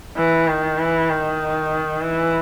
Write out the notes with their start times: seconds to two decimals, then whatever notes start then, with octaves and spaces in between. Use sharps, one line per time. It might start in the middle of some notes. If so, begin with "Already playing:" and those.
0.18 E3
0.48 D#3
0.79 E3
1.10 D#3
2.02 E3